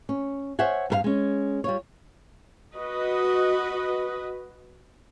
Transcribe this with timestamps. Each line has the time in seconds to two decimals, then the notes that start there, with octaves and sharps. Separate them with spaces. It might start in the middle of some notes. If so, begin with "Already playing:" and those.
0.09 C#4
0.59 C5 C#5 E5 F#5 G#5
0.90 G2 A#4 F5
1.04 G#3 C#4
1.64 G3 F4 C#5
2.76 F#4 B4 D#5